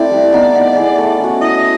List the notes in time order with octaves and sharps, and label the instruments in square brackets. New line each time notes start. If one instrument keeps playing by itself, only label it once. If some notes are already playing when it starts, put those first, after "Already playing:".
Already playing: [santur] A3 C4 E4 [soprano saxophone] D5
[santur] G3
B3 D#4
B3
E4 G#4
A3
C#4 F#4
[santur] E4 [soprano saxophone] D#5